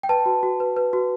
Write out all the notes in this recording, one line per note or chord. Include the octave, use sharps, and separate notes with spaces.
G5
B4 A5
F#4
F#4
B4
B4
F#4